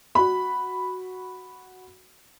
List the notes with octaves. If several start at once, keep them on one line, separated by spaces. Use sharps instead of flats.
F#4 B5